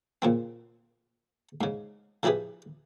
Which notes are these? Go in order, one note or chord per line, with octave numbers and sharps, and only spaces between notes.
A#2 C#3 C4
G#2 C#3
C#3 F3 E4 G4 G#4 B4